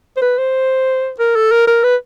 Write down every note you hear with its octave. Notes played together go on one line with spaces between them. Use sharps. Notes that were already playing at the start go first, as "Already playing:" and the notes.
C5
B4
C5
A#4
A4
A#4
A#4
B4